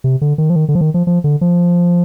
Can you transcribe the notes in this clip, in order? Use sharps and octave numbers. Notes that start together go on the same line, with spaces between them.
C3
D3
D#3
F3
D#3
D3
F3
D#3
F3
F3
D3
F3